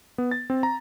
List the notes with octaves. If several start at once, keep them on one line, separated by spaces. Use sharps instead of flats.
B3
A6
C4
A#5